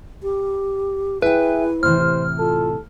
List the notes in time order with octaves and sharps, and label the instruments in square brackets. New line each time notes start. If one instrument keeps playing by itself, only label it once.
[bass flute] G4
[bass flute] E4 [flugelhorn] G#4 [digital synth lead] B4 [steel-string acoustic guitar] E5 G5
[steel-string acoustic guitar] A2 C3 E3 [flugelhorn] C5 [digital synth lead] F6
[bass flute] F4 [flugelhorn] A4